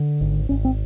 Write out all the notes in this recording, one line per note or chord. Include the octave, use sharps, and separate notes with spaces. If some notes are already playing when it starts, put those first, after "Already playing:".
Already playing: D3
G#1
G#1 C#4
C4